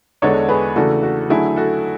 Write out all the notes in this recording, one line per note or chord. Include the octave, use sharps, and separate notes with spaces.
E2 D3 G#3 B3 D4 A4 C#5
G#4 B4
C#3 E3 A3 D4 F#4 A4
F#4
D3 F#3 A3 E4 G#4
F#4 A4